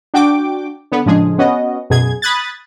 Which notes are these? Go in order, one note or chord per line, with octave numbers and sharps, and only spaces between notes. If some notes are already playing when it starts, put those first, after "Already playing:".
D4 F#4 G5 D6
D3 B3
A2 C#3 F3 G#3 D4 G#4
B3 C#4 F#4 D#5
F#2 B2 G#4 G#6
B5 D#6 F#6 G#6 A6